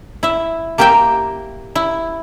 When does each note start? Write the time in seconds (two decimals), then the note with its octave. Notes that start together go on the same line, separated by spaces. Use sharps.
0.23 E4 E5
0.78 A#3 G4 A#4 E5 G5
1.75 E4